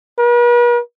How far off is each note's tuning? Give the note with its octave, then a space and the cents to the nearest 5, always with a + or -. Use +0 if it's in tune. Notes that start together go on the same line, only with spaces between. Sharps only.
B4 -45